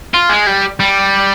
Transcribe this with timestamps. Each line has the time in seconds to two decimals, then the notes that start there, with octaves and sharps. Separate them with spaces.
0.14 F4
0.29 G#3
0.47 G3
0.80 G3